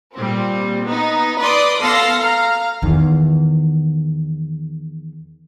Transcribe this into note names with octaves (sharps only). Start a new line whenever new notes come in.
A#2 G3 C4
B3 D#4
B4 D5 C6 D6 D#6
B3 A4 F5 C6 A#6 C7
F5 A#5
E2 D#3